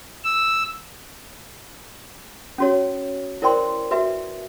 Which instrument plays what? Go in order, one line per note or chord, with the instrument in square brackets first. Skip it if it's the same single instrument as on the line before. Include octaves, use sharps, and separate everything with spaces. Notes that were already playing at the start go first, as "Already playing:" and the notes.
[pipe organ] E6
[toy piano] C#4 F#4 C#5
E4 A#4 C5 D5 G5 C6
F#4 B4 E5